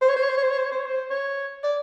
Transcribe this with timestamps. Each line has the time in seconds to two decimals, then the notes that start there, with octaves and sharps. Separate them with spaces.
0.02 C5
0.09 C#5
0.16 C5
0.23 C#5
0.29 C5
0.37 C#5
0.44 C5
0.51 C#5
0.58 C5
0.66 C#5
0.72 C5
0.79 C#5
0.86 C5
1.10 C#5
1.64 D5